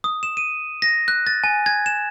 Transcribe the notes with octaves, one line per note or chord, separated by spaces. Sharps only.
D#6
E7
D#7
A#6
F#6
A6
G#5
G#6
E7